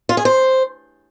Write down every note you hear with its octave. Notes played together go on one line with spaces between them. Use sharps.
F4
G#4
C5